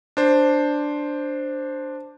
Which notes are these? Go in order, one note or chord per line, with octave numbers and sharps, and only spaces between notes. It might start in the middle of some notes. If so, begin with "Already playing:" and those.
D4 C5